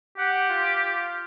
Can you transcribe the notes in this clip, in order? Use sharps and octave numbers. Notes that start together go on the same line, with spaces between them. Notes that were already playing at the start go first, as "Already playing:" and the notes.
G4 F#5
F4